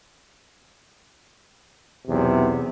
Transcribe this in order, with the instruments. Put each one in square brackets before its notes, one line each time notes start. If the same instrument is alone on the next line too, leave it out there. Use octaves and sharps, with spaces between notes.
[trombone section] B1 E2 C3